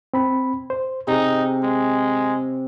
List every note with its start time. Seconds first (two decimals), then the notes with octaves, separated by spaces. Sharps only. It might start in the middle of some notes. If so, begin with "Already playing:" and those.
0.14 C4 B5
0.70 C5
1.07 C3 D#4 G#4
1.63 G#3